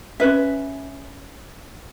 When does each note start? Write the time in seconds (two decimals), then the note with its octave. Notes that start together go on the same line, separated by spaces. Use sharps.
0.20 C#4 F4 B4 E5